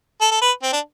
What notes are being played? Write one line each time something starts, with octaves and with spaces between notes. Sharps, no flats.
A4
A4
B4
C4
D4